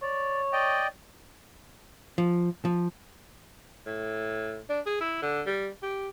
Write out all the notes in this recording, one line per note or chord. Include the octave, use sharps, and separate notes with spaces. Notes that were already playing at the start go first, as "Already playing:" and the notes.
C#5 D5
D5 D#5 G5
F3
F3
A2
D4
G#4
E4
D3
G3
G4